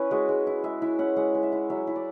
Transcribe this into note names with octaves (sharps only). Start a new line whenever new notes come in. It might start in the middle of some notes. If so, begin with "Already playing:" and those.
Already playing: C#4 E4 B4 C#5
G#3 F#4
G#3
E4
G#3 E5
E4 E5
C#4 F#5
G#3 F#5
G#3
E5
E4
F#3 E5
E4
D5